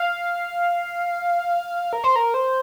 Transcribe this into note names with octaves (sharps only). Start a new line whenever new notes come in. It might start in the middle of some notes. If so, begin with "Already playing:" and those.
Already playing: F5
A#4
C5
A#4
C5